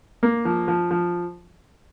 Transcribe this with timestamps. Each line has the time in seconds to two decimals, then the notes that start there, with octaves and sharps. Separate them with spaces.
0.23 A#3
0.45 F3
0.68 F3
0.91 F3